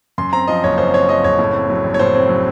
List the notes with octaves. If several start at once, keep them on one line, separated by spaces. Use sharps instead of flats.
F#2 C6
C4 A#5
F3 D#5
F#1 C#5
F#2 C5
C4 C#5
F3 D#5
F#1 C#5
A2
C4
F#3
A#1
C#5
A2 C5
C4
F#3